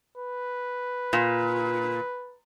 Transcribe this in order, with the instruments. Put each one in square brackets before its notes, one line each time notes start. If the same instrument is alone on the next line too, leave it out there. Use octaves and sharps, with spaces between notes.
[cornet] B4
[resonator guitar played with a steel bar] A#2